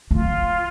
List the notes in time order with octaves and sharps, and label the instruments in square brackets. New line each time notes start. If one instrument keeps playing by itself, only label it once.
[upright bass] A3 [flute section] F4